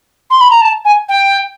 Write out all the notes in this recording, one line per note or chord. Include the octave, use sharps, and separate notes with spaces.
C6
B5
A#5
A5
G#5
G5